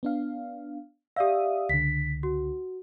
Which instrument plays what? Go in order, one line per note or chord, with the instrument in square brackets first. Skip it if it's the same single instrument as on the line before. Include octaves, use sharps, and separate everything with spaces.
[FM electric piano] B3 D4 F5
[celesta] G4 D5 F5 [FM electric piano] E5 D#6
[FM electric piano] C#2 D3 [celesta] B6
[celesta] F#4